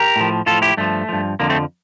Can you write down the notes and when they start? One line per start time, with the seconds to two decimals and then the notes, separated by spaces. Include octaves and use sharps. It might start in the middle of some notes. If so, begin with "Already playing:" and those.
Already playing: G4 A#4
0.16 A2 F3
0.46 A2 F3 F4 A4
0.62 E4 G4
0.77 G2 F3 A3
1.09 G2 F3
1.40 F2 D3 F3 A#3
1.50 A3 C4